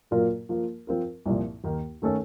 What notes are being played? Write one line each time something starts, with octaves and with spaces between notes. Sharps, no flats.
A#2 F#3 A#3 F4 A#4
F3 A#3 F4 A#4
F3 C4 F4 A#4
C2 A#2 F3
D#2 D#3 A#3
D#3 A3 C#4 A4